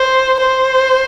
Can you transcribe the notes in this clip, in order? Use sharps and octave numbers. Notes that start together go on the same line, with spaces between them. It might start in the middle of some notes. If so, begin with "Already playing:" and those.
Already playing: C5
C5